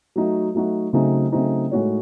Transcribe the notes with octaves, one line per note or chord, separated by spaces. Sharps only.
F#3 A3 D#4 F#4
F#3 A3 D#4 F#4
C#3 F#3 A3 C4 D#4
C#3 F#3 A3 C4 D#4
A2 G#3 D#4 F#4 C#5